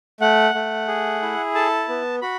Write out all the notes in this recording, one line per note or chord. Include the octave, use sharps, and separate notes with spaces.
A3 F#5
A3
G#4
E4
A4 A5
B3
F#4 B5